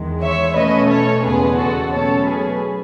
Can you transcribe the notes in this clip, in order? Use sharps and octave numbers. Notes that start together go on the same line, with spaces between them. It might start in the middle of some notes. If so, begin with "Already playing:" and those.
Already playing: E2 D#3 G#3
C#5 E5
B2 A3 C#4 B4 D#5
A4 C#5
E2 C#3 G#3 B3 G#4 B4
F#4 A4
B2 F#3 A3 C#4 A4 C#5
G#4 B4